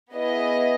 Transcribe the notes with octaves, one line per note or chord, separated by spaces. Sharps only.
B3 E4 G#4 D#5